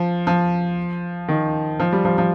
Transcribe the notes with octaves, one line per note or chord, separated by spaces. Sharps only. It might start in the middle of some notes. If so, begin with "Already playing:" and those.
Already playing: F3
F3
D#3
F3
G3
F3
F3